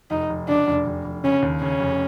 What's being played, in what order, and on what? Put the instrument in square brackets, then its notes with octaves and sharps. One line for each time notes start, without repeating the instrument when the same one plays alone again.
[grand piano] F1 [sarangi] D#4
[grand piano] F1
[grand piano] C#3 [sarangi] D4
[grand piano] F1
F1
F1
[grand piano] C#3 [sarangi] C#4
[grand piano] D#2
[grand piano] C#3 [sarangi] C#4
[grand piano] F1